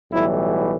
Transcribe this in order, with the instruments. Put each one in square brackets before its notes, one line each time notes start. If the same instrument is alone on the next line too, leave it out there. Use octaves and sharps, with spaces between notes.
[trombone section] B1 A2 E3 G3 E4